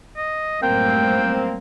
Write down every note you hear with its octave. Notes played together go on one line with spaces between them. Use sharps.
D#5
F#2 A2 G3 A#3 C4 G5